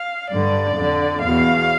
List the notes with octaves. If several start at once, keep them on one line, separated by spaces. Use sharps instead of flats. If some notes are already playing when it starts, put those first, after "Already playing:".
Already playing: F5
G2 D3 D5
F2 D3
E2 B2 F5